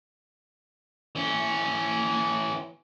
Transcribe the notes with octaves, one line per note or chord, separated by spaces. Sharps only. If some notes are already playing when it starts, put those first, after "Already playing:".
E3 C#4